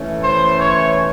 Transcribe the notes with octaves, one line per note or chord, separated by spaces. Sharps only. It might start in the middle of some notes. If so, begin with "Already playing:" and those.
Already playing: E3 A3 C#4
C5
C#5